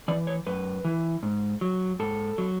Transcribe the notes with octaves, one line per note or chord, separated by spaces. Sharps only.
E3 D5
C#5
F#2 B4
E3
G#2
F#3
G#2 A4
F#3